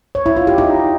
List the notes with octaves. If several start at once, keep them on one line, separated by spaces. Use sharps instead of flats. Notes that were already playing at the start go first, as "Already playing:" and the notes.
C#5
E4
F4
G4
D#4